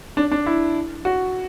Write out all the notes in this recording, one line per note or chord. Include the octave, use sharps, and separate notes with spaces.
D4
D4
E4
F#4